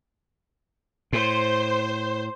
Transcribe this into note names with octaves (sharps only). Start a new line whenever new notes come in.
A2 C5